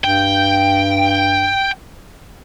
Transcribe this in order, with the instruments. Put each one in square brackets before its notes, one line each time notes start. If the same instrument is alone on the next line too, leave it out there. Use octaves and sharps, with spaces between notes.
[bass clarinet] G2 [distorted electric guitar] G5